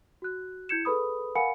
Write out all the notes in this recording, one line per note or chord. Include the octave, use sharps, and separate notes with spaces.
F#4 F#6
E4 G6 G#6 C#7 E7
G#4 A4 B4 B5 D#6
A#4 F5 F#5 G#5 B5 C#7